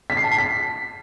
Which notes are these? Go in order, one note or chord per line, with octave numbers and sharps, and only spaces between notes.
B6
C7
A5
C7
B6